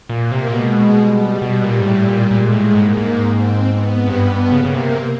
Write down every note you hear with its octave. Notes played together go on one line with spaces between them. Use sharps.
A#2 A#3
C3
A#2
B2 G#3
G3
B2 G3
A#2
G#2
A2
A#2
A#2 G#3
A2
G#2 A#3
G#2
C4
B3
G2
C#3 A#3
C#3
C3